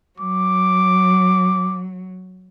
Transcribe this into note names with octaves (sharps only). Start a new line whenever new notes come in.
F#3 D6